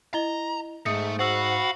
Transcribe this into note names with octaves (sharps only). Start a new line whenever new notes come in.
E4 D#5 A#5 G7
G#2 A3 D#6 C#7
F#4 C5 F5 F#5 B5 E6 F#7